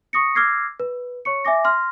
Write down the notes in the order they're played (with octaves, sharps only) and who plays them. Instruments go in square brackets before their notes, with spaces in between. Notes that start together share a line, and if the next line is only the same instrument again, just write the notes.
[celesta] C#6 D#6 A#6 C#7
D6 E6 F6 G#6 A#6 C7
B4
C#5 C#6 C#7
E5 G#5 D6 A#6
C6 F6 A#6